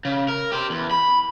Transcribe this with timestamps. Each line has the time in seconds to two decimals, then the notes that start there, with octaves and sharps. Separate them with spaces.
0.05 C#3
0.28 A#4
0.52 G4 C5
0.70 E2
0.91 B5